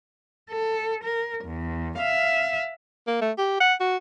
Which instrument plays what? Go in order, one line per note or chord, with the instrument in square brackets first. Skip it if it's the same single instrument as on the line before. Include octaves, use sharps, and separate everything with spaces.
[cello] A4
A#4
E2
E5 F5
[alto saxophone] A#3
A3
G4
F#5
F#4